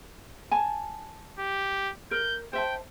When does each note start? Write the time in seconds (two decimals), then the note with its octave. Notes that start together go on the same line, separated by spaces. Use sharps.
0.51 G#5 A5
1.40 G4
2.11 A#4 G6
2.53 C5 E5 G5 A5